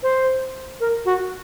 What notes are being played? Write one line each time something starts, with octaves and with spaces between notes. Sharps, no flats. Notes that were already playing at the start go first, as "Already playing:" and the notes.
C5
A#4
F#4